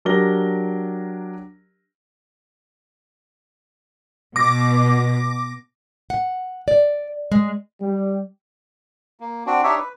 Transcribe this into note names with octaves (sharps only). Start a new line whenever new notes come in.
F#3 D4 G4 A#4 A#6 G7
B2 D6 A#6
F#5
D5
G#3
G3
A#3
C4 D4 F#4
D4 D#4 G4 C#5 E5
B4